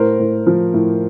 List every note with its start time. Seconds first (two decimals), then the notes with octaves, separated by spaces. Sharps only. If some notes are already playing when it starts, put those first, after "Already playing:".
Already playing: A2 A#4 C5
0.19 A2
0.47 F3
0.74 A2